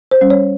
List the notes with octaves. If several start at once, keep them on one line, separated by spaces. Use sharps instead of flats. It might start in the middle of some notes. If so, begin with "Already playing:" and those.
C5
G3 C#4
C#5